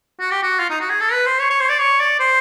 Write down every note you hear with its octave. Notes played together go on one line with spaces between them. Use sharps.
F#4
G4
F#4
F4
D#4
F#4
G#4
A4
B4
C5
C#5
C#5
C5
D5
C#5
D5
C5